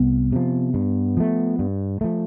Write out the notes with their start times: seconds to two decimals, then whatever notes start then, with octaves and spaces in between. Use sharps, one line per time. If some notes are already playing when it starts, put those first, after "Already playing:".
Already playing: C2 B3
0.32 C3 F3
0.74 G2
1.17 F3 A3
1.59 G2
2.01 F3 A3